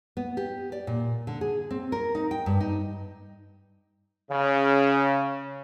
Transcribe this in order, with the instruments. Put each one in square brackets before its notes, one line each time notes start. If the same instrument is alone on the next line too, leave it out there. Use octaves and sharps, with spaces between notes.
[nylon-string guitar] B3
G4
D5
A#2
D3
G#4
C4
A#4
D#4
G5
G2
D#4
[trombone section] C#3